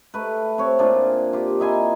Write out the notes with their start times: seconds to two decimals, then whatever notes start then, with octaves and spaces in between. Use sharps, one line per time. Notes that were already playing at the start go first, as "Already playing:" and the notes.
0.14 A3 B4
0.58 C4 C#5
0.79 A#2 D4 F4 G#4
1.33 F4 G4
1.60 D#4 E4 G#5 C6